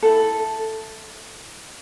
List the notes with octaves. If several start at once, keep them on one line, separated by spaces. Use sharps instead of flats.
E4 A4